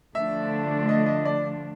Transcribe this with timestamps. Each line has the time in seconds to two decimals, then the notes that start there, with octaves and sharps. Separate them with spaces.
0.15 D3 F3 A3 D4 E5
0.89 D#5
1.06 D#5
1.25 D5